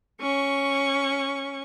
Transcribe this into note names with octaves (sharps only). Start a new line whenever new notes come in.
C#4 C#6